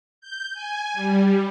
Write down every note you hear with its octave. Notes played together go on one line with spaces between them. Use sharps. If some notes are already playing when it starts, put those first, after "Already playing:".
G6
G#5
G3